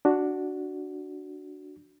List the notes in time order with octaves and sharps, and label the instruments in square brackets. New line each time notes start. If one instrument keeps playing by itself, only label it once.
[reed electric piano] D4 F#4